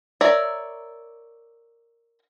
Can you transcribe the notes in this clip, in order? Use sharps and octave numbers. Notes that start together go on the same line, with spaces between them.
A#4 C#5 D5 E5